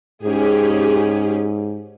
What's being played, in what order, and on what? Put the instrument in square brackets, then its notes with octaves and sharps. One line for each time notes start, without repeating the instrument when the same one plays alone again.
[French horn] G#2 [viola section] C#4 G4 G#4